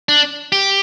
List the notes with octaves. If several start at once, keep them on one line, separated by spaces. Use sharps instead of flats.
D4
G4